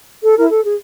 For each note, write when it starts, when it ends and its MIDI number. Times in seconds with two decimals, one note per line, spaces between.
0.21 0.35 69
0.37 0.46 64
0.37 0.46 70
0.50 0.63 69
0.65 0.75 68